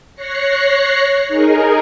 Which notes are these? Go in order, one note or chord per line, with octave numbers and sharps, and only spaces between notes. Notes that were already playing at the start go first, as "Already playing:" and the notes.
C#5 F#6 A#6 C7 C#7
D#4 G#4 A#4